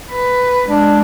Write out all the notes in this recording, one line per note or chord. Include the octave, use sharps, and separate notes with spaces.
B4
G#3 D4